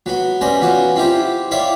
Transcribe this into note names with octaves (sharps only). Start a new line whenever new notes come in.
F#3 B3 F#4
G3 B3 C#4 C5 D#5
B3 C#4 F4 F#4
C4 E4 F4 G4 C5
E4 C#5 D5 E5 F5 G5